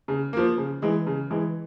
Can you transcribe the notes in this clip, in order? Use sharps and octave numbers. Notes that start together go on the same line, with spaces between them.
C#3
F3 A#3
C#3
E3 G#3
C#3
E3 G#3